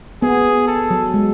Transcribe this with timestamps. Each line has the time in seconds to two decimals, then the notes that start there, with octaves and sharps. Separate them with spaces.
0.22 B3 G#4
0.68 A4
0.91 F#3
1.14 G#3